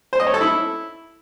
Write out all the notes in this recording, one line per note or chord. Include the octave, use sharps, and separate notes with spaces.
C5
D#5
C#5
A4
E4